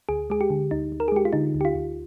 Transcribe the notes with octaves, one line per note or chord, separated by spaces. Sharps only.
D2 G#4
G#3 G#4
G4
D3
D2 D#4
D2
A#4
G#4
G#3 G4
F4
D3 D#4
D2
G4
F4
D2